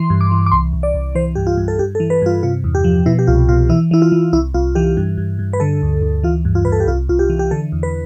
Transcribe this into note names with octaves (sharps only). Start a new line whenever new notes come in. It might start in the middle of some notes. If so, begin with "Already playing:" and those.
Already playing: E3 C6
G2
D6
E3
D6
C2 C6
C2
D5
C2
E3 C5
G2 G4
F4
G2
A4
G2 G4
A4
E3
B4
G2 F4
C3 F4
E2
G4
F3
B2 E4
G4
C2 F4
B2 F4
E3 E4
E3 E4
F4
E3
C2 E4
C2 F4
E3 G4
G2
G2
G2
B4
D3 A4
D2
D2
E3 F4
G2
F4
G2 B4
A4
G4
C2 F4
C2 F4
G4
E3
G4
D3 A4
E2
B4